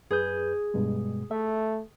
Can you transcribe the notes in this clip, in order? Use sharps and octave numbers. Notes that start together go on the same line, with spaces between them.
F#2 G#4 B4 G6
G2 B2 G#3
A3 E5